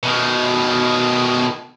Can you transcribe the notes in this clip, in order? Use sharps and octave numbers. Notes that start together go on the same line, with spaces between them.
B2 D#3